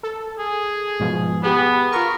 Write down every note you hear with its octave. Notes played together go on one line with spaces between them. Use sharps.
A4
G#4
G#2 B2 F3
B3 G4 G#4 B4
F4 A#4 C#6